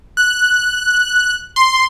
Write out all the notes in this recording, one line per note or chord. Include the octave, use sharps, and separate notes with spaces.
F#6
C6